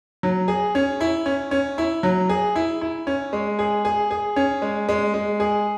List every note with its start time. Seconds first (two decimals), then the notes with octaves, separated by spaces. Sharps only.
0.23 F#3
0.48 G#4
0.75 C#4
1.01 E4
1.26 C#4
1.51 C#4
1.78 E4
2.03 F#3
2.29 G#4
2.56 E4
2.81 E4
3.07 C#4
3.33 G#3
3.59 G#4
3.85 G#4
4.11 G#4
4.36 C#4
4.62 G#3
4.89 G#3
5.14 G#3
5.40 G#4